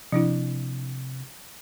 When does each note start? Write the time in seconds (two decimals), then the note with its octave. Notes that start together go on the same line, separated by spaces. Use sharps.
0.12 C3 F3 D4 E4